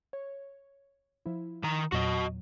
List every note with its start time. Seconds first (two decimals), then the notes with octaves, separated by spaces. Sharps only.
0.13 C#5
1.26 F3 E4
1.63 D#3 A#5
1.92 E2 A#2 F#3 F#4 D#5